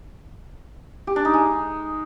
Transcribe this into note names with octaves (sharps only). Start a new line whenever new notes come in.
G4
D4
D#4
G#3